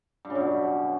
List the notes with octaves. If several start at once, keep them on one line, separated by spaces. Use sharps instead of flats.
G2
C#3
F#2
B2